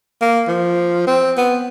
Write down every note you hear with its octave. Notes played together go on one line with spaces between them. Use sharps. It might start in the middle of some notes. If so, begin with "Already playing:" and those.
A#3
F3
C4
B3